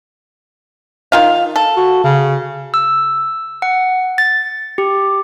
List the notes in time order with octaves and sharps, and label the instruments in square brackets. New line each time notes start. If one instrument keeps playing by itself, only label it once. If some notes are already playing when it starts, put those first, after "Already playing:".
[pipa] D#3 F4 F5
A4
[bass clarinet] F#4
C#3
[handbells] E6
F#5
A6
G4